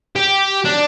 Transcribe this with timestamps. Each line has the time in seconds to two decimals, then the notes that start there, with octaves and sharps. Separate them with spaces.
0.16 G4
0.65 D4